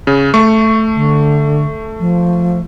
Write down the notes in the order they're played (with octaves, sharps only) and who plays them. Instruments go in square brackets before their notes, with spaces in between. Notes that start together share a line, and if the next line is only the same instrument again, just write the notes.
[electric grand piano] C#3
A3 C#6
[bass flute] D3
F3